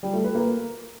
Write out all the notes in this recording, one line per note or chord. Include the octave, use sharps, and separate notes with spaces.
G3
A3
B4
A#3